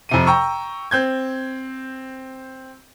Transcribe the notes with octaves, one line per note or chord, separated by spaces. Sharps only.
F2 C3 D#7
G5 A#5 C#6 E6
C4 G6 G#6